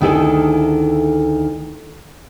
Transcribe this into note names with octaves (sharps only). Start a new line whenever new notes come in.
D2 D#3 E4 G#4 A4 G#5